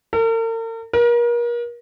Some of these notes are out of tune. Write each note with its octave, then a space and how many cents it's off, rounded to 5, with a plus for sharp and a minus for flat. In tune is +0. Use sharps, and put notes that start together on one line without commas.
A#4 -45
A#4 +35